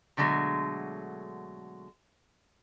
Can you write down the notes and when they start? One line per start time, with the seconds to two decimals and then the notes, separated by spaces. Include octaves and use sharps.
0.17 B2 D3 F#3 G#3 A3